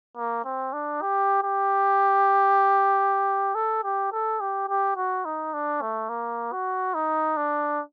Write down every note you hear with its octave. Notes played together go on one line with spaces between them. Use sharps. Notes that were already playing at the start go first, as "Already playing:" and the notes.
A#3
C4
D4
G4
G4
A4
G4
A4
G4
G4
F#4
D#4
D4
A3
A#3
F#4
D#4
D4